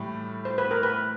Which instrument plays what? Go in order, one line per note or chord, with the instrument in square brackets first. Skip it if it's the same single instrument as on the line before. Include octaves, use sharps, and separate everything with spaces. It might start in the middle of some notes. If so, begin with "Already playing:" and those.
Already playing: [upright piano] A2 E3 G3
[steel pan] C5
B4
A#4
B4